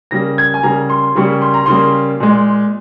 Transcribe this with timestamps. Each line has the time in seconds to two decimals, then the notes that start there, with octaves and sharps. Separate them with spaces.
0.11 C#3 G3 A#3 A#6
0.38 G#6
0.54 G#5
0.63 C#3 G3 A#3 A#5
0.90 C6
1.15 C#3 G3 A#3 C#6
1.42 C6
1.54 A#5
1.66 C#3 G3 A#3 C6
2.20 A#2 G#3